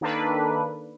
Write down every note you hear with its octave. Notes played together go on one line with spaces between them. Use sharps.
D#3 A#3 D4 A4 B4